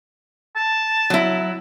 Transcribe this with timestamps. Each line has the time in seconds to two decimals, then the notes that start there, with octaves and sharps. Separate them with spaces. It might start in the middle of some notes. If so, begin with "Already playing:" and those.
0.56 A5
1.10 F#3 E4